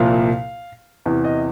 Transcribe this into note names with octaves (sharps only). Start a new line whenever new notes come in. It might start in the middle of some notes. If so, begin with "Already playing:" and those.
Already playing: C2 A#2 F3 F5
E2 C3 E3
D#5